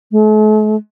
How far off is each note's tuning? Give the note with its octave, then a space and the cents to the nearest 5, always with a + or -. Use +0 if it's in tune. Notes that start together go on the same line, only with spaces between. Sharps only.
A3 -45